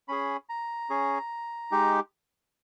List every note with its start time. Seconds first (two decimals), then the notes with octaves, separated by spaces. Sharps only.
0.08 C#4 G#4 B5
0.49 A#5
0.90 C#4 G#4
1.71 G#3 D#4 G4